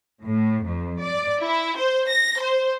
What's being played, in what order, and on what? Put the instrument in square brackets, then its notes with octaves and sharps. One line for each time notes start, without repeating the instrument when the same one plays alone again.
[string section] A2
F2
D5
E4
C5
A#6
C5